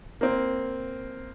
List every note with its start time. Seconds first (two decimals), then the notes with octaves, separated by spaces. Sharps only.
0.21 A#3 C4